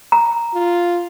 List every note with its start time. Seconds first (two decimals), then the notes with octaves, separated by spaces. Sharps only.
0.12 A#5
0.55 F4